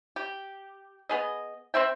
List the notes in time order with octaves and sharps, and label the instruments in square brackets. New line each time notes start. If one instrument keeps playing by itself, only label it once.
[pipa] G4
B3 G#4 D#5
C4 C5 E5 G5